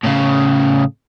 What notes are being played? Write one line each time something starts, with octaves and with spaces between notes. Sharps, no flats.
A2 C#3